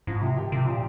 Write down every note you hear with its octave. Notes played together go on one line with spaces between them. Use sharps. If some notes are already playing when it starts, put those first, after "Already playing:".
G#2 F3
C3 F3
D#3 G4
C3 F3
A#2 F3